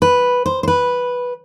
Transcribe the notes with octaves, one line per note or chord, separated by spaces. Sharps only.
B4
C5
C5
B4